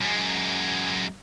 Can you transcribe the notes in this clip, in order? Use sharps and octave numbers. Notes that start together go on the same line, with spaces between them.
F#2 G#3